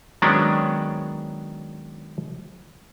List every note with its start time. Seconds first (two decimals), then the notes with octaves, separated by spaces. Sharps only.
0.22 D#3 F#3 G#3 B3 C#4 D4